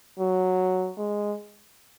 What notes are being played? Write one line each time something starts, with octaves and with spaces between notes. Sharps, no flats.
F#3
G#3